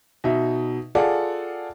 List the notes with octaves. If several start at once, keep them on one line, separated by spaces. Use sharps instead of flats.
B2 D#4 E5
F4 G#4 A4 D5 F#5